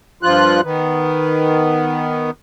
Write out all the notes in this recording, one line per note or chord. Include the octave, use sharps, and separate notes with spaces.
G2 F3 F4 F#6
D#3 B3